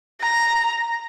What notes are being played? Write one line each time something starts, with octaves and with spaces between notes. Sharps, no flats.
A#5